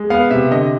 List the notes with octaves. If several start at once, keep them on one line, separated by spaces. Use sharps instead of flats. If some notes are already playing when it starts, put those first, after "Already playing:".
Already playing: G#3
B3 F5
C3 E5
D3 D#5